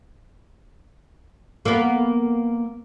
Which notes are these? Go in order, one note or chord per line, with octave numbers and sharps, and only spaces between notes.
A#3 B3